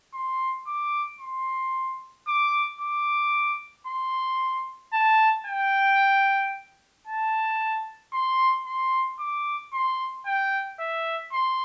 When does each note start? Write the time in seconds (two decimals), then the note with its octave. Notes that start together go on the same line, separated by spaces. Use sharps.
0.14 C6
0.67 D6
1.20 C6
2.27 D6
2.81 D6
3.87 C6
4.93 A5
5.47 G5
7.07 A5
8.13 C6
8.66 C6
9.19 D6
9.73 C6
10.26 G5
10.80 E5
11.33 C6